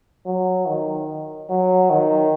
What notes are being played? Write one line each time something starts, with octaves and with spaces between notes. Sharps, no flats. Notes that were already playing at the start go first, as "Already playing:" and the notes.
F#3
D#3
F#3
D#3